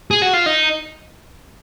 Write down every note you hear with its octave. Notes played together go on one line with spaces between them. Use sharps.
G#4
F#4
F4
D#4